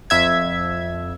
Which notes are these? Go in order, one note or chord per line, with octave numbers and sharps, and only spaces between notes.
F2 E5 G#6